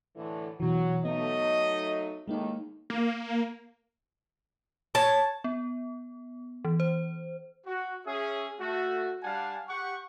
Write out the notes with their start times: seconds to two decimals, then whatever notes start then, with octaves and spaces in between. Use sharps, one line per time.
0.16 A2 D3 E3
0.60 B2 E3 F#3
1.05 F#3 A3 B3 D#4 D#5
2.28 D#2 A2 D#3 G#3 A#3 D#4
2.90 A#3
4.95 C#5 A5
5.44 B3
6.65 E3
6.80 C5
7.66 F#4
8.06 C#4 G#4 E5
8.60 A3 F#4
9.23 G3 D4 F5 F#5 G#5 A5
9.69 G4 F#5 C#6